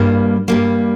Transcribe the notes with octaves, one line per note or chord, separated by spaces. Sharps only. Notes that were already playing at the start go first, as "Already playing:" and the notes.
Already playing: G2 G3 A#3
G2 G3 A#3